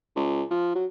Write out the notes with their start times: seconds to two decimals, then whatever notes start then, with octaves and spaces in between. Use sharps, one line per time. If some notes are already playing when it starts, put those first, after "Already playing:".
0.16 C#2
0.51 F3
0.75 F#3